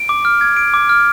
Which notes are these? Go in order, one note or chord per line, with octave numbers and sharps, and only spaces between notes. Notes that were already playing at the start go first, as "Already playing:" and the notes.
Already playing: D7
D6
F6
G#6
D7
D6
F6